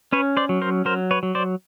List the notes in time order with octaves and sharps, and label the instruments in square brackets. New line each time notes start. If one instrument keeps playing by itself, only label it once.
[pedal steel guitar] C#4 B4 C#5
C5 D5
F#3
A#4 C5
F#3 A#4 C5
B4 C#5
F#3
C5 D5